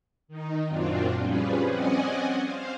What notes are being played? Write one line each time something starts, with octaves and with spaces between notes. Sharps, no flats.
D#3 D#4
F#2 A#2 F#3 C4 D4 F4
F3 G3 C#4 G#4 B4
C4 C#4 D5 D#5 F#5 G#5
C5 F5